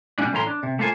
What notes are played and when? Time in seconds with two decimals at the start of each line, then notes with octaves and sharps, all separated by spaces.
0.18 B2 G3 A#3 C#4 D4
0.33 A2 E3 A3 C#4 A#5 C6
0.47 D4
0.63 C3
0.79 A3 A#3 F4 C5 G#5